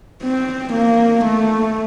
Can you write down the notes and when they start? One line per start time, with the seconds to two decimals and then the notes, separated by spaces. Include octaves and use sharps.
0.23 C4
0.73 A#3
1.25 A3